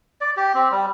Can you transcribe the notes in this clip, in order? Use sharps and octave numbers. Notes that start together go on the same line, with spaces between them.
D5
G4
C4
G3